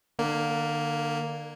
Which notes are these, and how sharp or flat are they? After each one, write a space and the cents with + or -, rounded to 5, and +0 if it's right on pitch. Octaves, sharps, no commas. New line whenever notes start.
D3 +35 A#3 +0